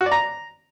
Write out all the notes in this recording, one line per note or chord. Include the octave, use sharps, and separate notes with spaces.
F#4
D5
A#5